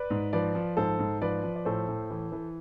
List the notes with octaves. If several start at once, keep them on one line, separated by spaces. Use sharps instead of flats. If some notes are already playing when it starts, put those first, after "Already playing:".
Already playing: B4 D5
G#2
F3 B4 D5
F3
G#2 A4 C5
G#2
F3 B4 D5
F3
D5
A2 A4 C5
A2
E3
E3